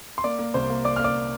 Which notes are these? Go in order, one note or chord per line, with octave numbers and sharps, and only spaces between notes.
C6
A#3 D5 D6
A#3
C2 C5 C6
A#3
A#3 D5 D6
A#3 F6
D5 D6